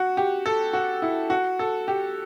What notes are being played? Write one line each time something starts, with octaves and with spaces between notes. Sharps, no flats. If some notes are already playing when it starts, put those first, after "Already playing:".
Already playing: F#4
G4
A4
F#4
E4
F#4
A4
G4